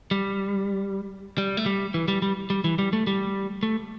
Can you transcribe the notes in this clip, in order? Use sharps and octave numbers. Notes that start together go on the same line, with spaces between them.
G3
G3
A3
G3
E3
G3
G3
G3
E3
G3
A3
G3
A3